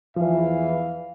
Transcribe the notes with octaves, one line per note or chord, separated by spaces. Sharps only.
E2 E3 F3 F5